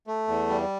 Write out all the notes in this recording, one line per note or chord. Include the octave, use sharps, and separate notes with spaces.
A3
E2
G3